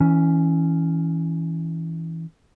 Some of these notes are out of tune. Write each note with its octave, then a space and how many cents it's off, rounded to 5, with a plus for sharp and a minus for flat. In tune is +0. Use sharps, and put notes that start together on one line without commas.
E3 -15 C#4 +5